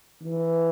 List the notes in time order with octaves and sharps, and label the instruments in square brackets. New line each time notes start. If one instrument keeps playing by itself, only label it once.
[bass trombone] E3